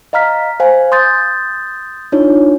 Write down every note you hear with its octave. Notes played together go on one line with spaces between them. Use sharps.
D#5 F5 A#5 F6 B6
C5 F5 G#5
C6 D#6 G6 A6
D4 D#4 F4 C#5